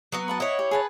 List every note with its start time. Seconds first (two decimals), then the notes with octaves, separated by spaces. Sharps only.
0.12 F#3 B3 F#4
0.28 B4 F#5 A5
0.40 E4 C#5 D#5 F#5
0.59 G4
0.71 G#4 B4 A5